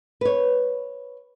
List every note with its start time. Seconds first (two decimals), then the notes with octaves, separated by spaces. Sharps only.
0.21 B4 C#5